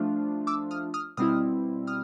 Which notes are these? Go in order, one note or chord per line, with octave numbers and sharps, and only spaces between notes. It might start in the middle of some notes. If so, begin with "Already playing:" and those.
Already playing: F3 A3 D4 F4
D6 E6
D#6 F6
D#6 F6
B2 G3 C4 E4 D#6 F6
D#6 F6